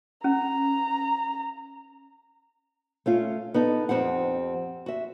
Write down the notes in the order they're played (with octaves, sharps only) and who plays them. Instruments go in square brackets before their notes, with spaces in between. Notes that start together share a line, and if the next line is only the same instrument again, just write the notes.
[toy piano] C#4 [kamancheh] A#5
[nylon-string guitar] A3 C#4 F4
B3 D#4 A4
F2 G#2 C4 G4 F#5
F#4 E5